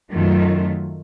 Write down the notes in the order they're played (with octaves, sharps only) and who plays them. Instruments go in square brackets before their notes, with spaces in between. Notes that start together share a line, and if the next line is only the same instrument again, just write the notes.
[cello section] F#2 D#3 F#3 A3 F4